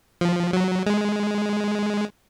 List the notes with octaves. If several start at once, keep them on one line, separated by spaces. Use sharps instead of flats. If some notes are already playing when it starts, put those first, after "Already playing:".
F3
F#3
G#3